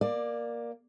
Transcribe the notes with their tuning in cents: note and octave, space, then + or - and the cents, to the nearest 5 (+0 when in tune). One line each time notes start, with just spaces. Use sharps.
A#3 +10 D5 +15